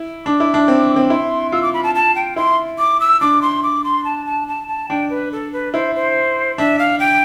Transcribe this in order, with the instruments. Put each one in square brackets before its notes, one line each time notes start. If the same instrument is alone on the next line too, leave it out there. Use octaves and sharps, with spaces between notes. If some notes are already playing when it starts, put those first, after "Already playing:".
Already playing: [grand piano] E4
[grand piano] D4 [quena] D6
[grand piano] E4
D4
C4
C4
[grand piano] E4 [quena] C6
[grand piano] F4 [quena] E6
[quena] D6
B5
A5
A5
G5
[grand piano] E4 [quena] C6
[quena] D6
E6
[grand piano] D4 [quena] D6
[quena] C6
D6
C6
A5
A5
A5
A5
[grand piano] D4 [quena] G5
[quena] B4
A4
B4
[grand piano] E4 [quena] C5
[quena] C5
[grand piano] D4 [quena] E5
[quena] F5
G5